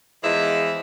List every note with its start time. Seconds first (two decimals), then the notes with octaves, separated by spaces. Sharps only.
0.24 E2 E3 F3 G#3 D#5 E5